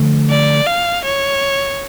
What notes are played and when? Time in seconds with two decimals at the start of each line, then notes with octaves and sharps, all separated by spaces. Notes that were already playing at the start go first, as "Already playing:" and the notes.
Already playing: D3 F3 A3
0.30 D5
0.67 F5
1.05 C#5